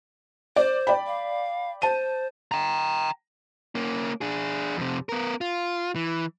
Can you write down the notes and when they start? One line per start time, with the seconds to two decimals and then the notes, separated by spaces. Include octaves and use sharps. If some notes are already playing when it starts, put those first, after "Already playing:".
0.56 C5 D5
0.87 D5 G5 B5
1.07 F5
1.82 C5 A5 D#7
2.52 G5 A#5
3.75 A#3 C#4
4.21 D4 G#4
4.77 F2 C3
5.09 B3 A#4
5.41 F4
5.96 E3